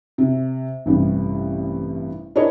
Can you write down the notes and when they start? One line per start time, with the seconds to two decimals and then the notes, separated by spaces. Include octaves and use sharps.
0.18 C3
0.86 A1 G2 C3
2.36 D4 E4 G#4 A#4 C#5 D#5